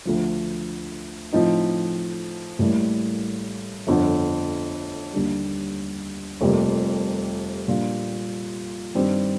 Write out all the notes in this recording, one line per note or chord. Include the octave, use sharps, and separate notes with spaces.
D2 D3 F3
A2 F3 C4 D#4
A1 A2 G3 A#3
G1 F2 D3
D#2 D3 G3
F1 F2 C3 G3 A#3
A#2 G3 D4 F4
G2 D#3 G3 C4